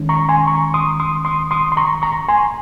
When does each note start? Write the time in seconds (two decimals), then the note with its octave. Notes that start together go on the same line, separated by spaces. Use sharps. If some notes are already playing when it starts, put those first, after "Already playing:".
Already playing: D#3 G#3 C#4
0.09 A#5 C#6
0.29 G#5 C6
0.47 A#5 C#6
0.74 C6 D#6
1.00 C6 D#6
1.25 C6 D#6
1.51 C6 D#6
1.72 C6
1.77 A#5 C#6
2.02 A#5 C#6
2.29 G#5 C6